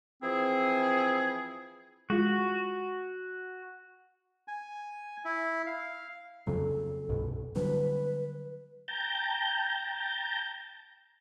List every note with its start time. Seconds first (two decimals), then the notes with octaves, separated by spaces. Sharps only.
0.22 E3 F3 C4 E4 G#4
2.10 G#3 F4 F#4
4.48 G#5
5.25 E4
5.66 F5
6.47 F2 C#3 F#3 A4
7.09 C2 G2 B2
7.56 D3 F#3 G3 B4
8.88 G5 A5 A#5 G6